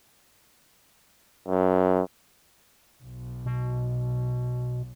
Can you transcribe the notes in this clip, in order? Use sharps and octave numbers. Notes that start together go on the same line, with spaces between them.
F#2
B1
B2